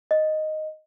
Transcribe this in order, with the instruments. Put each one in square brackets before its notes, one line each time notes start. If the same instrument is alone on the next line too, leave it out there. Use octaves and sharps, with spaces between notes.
[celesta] D#5